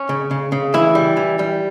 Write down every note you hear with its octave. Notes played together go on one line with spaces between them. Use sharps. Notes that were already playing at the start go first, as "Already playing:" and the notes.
Already playing: C#4
C#3
C#3
C#3
E3 E4
G3
E3
G3